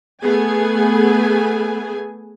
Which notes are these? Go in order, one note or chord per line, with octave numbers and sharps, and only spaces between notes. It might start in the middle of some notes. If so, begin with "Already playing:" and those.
A3 B3 G#4 G#5